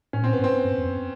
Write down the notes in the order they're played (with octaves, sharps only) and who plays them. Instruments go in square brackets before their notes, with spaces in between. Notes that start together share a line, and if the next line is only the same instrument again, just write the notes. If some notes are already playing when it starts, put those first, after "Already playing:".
[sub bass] A2 [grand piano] C#4
[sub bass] A#2 [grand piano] C4
[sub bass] A2
[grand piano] B3
[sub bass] G#2
[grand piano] C4
[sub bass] G2
F2
F#2